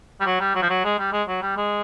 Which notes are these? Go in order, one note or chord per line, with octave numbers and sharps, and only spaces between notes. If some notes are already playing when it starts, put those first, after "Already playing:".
G3
F#3
G3
F#3
F3
F#3
G#3
G3
G#3
F#3
G3
G#3